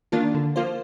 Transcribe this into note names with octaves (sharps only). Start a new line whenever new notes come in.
D#3 A#3 D4 F4
D3
F3 A#3 F4 C5